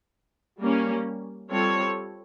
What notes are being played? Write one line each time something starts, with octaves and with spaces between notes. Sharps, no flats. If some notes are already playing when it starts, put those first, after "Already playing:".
G3 A#3 C#4
G3 C4 F4 A4 C#5